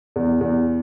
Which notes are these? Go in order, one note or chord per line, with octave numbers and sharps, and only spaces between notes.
E2
E2